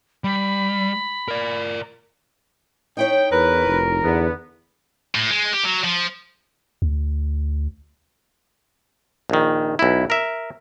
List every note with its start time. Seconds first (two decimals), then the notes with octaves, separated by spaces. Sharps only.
0.24 G3 B5
1.28 A#4 D5
2.97 D#4 E4 C#5 G5
3.32 E2 A#4 B4
3.67 F1
4.03 E2 D3 B3
5.15 A2
5.31 G#3
5.53 G4
5.64 F#3
5.84 F3
6.82 D2
9.30 A#1 D#3
9.79 B1 E4
10.10 A#4 E5